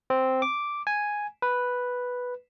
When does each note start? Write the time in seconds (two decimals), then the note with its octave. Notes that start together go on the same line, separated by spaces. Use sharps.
0.10 C4
0.42 D6
0.87 G#5
1.42 B4